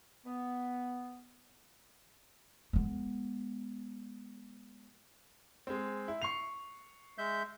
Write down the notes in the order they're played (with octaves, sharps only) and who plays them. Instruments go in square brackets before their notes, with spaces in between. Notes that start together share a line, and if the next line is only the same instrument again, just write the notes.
[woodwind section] B3
[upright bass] G#3 B3
[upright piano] G#3 C4
E4
C#6 C7 F7
[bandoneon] G#3 E5 G6